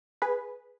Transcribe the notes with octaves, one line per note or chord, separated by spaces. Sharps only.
G#4 B4